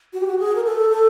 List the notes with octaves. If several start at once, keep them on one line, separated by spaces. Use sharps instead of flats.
F#4
G4
F#4
G#4
A#4
A4
A4